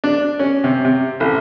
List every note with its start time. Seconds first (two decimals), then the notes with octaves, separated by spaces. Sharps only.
0.04 D4
0.39 C#4
0.64 C3
0.85 C3
1.20 A1